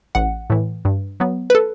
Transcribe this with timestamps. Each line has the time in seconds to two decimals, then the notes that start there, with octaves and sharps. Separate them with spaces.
0.15 A1 F#5
0.50 A2 E3
0.85 G2
1.20 F#3 B3
1.50 B4
1.55 A4